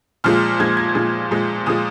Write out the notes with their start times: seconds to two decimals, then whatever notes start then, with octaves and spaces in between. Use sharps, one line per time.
0.24 A#2 F3 G#3 F6
0.60 A#2 F3 G#3 G#6
0.77 G#6
0.95 A#2 F3 G#3
1.31 A#2 F3 G#3
1.66 A#2 F3 G#3 D#6